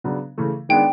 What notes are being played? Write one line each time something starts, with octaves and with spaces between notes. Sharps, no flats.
C#3 F#3 B3 D4
C#3 E3 A3
D#3 G#3 B3 D4 G5